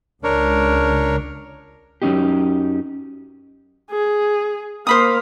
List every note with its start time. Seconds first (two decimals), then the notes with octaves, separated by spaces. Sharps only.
0.24 C#2 D4 A#4 C#5
2.02 F#2 F#3 G#3 C#4 D#4 G4
3.91 G#4
4.87 A#3 C5 F5 B5 D#6